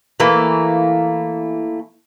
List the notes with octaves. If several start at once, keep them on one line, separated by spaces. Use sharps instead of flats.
E3 A3 A#3